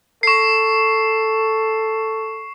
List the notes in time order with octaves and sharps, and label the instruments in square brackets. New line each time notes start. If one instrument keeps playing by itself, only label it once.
[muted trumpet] A4 [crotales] C#6 C7